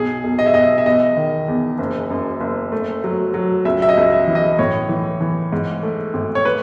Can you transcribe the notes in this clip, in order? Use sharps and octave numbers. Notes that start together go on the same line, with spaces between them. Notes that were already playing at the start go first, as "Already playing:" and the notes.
Already playing: B1 G#4
B1
D#5
E5
B1 D#5
E5
E2 D#5
D#3
E2
F#1
F#2
F#1
A3
F#3
F#3
C#2 E5
E5
D#5
C#2
E5
E3
D#5
A2 C#5
E3
E3
G#2
A3
G#1
C#5
B4